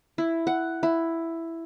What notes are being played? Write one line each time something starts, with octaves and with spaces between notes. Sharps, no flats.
E4
F#5
E4